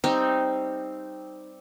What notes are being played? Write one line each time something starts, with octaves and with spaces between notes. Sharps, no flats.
G3 C4 D#4